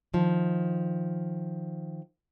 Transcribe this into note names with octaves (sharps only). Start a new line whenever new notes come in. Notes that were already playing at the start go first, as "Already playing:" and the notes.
D#3 F3